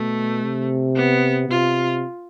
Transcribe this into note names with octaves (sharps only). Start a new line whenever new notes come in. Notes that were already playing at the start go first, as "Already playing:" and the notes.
Already playing: B2 A3
C3
B3
C3 F4